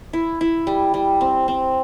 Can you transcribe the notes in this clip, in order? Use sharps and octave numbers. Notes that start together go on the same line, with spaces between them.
E4
E4
G3
G3
C4
C4